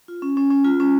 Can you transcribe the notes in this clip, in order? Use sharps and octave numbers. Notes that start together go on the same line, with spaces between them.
F4
C#4
C#4
C#4
F4
C#4